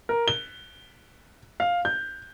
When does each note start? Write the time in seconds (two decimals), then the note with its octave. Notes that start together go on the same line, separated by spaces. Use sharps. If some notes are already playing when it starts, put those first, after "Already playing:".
0.09 A#4
0.28 G7
1.60 F5
1.85 G6